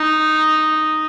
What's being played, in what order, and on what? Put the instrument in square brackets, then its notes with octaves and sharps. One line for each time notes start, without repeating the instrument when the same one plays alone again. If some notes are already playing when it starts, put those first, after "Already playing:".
Already playing: [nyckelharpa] D#4